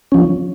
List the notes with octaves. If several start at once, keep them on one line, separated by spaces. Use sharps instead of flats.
F3 C#4